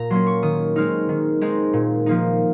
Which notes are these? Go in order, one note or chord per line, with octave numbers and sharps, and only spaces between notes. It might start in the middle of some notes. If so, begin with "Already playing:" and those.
Already playing: A#2 A#5
F#3 A#3 C#4 C6
C#6
D#3 D#6
G#3 C4 D#4 F6
D#3
G#3 C4 D#4
A#2
F3 A#3 D#4